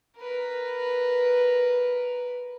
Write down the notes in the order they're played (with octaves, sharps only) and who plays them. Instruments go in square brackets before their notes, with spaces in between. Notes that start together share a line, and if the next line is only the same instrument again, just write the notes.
[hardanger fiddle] A#4 B4